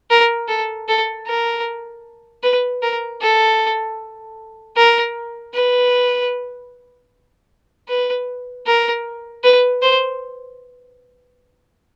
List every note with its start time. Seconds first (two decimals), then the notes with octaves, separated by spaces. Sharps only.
0.10 A#4
0.48 A4
0.88 A4
1.27 A#4
2.43 B4
2.82 A#4
3.21 A4
4.77 A#4
5.54 B4
7.88 B4
8.66 A#4
9.44 B4
9.82 C5